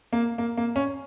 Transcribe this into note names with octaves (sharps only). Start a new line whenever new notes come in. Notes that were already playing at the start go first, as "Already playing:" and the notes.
A#3
A#3
A#3
C#4